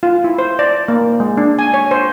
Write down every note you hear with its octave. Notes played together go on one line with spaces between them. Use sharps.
F4
E4
C5
D5
A#3
G#3
D4
G#5
C#5
C5